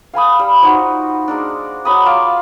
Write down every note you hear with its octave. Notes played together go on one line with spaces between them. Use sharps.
F5 G#5 B5 D#6
G3
F3 D#4 F#4
G#3 A#3 D4
F#3 B5 D#6
F4 F5 D6